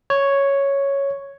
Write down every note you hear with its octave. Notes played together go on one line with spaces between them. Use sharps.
C#5